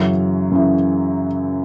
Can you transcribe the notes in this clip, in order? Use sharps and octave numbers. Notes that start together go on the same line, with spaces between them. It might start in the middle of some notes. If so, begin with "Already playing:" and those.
Already playing: F#2 C#3 E3 F#3
F#2 C#3 E3